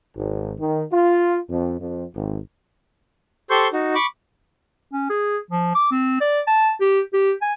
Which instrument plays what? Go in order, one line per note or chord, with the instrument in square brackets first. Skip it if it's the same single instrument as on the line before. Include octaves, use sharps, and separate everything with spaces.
[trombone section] G#1
D#3
F4
F2
F2
G#1
[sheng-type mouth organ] G4 A4 C5 C6 C#6 G6
D#4 F#4
B5 C#6 D6
[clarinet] C#4
G#4
F3
D6
C4
D5
A5
G4
G4
G#5